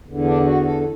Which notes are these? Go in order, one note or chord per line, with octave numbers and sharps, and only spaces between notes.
E2 D3
D4
F#4
A4